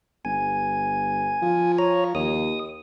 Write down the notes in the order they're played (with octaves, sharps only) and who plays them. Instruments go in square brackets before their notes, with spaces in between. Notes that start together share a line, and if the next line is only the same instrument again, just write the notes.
[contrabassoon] G1 [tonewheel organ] G#5
[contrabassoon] F3
[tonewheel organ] C#5 A#5
[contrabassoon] D#2 [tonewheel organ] D#6